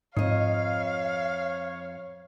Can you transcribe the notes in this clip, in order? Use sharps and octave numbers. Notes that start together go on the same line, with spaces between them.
F2 G#2 C#5 D#5 F5 D#6 C7